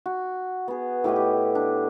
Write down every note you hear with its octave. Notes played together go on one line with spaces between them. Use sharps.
F#4
B3 G#4
A2 G4 B4 D#5
G4
D4